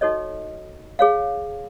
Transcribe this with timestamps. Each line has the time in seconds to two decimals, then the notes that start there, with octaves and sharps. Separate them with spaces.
0.01 D#4 F#4 A4 C#5 D#5
0.99 G#4 C#5 F5